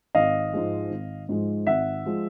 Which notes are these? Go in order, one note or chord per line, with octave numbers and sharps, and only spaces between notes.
G#1 D#5 F5
G#2 F3 G#3
G#1
G#2 F3 G#3
G#1 E5 F#5
F3 G#3